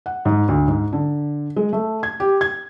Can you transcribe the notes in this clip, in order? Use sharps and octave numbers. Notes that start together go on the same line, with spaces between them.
F#5
G#2
D2
G#2
D3
G#3
A3
G#6
G4
G#6